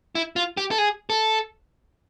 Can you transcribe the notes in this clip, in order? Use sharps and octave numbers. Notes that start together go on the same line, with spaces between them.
E4
F4
G4
A4
G#4
A4